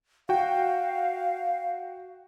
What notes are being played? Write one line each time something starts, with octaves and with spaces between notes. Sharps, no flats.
F#4 F5 G5